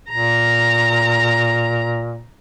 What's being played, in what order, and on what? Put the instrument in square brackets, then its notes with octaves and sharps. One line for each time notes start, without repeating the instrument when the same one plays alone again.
[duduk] A#2 [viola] A#5